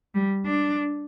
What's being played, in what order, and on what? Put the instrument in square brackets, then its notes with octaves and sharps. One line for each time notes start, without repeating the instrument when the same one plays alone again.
[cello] G3
D4